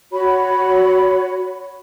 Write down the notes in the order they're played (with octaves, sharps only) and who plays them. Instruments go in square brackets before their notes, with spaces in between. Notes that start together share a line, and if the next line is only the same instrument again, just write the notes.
[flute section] F#4 C#5 B5